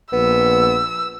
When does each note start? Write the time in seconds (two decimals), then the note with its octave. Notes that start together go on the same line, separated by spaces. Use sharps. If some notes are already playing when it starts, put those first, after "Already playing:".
0.12 A#1 B3 E6